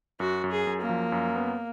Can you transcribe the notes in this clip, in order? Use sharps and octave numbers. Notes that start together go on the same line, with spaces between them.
F#2 F#4
F#2
G#4
F#2
A#3
F3
F#2
B3